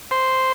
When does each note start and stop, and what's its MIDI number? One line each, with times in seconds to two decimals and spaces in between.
0.11 0.52 72